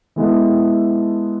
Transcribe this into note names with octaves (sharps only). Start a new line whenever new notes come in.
E3 G#3 B3 E4 A4